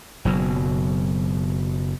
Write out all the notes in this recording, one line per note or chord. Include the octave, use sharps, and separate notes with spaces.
F#1 B2 F#3